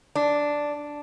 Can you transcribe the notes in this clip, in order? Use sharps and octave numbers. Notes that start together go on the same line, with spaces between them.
D4